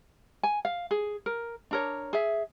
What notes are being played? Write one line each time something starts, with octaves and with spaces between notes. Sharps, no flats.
G#5
F5
G#4
A#4
D4 A#4 C#5
G#4 E5